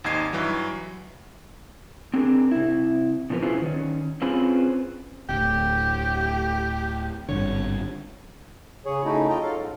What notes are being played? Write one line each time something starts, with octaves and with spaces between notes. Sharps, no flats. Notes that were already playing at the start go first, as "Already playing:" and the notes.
G#1 D#2 D#4 D#5 G#6 C7
G2 E3 F#3
C4 D4 G#4 A#4
C3 E4
B2 F3 D4 A#4 B4
C#4 E4 F4 G#4 B4 C5
D#3 C#4
C4 C#4 F4 G#4 B4 C5
D1 D2 G4
G#1 G2 D3 C#5
C#3 G#4 C#5
C#3 A3 C#4 D#4 E4 F#4
F4 D#5 G5 A#5
F#3 F4 A4 F5
G#2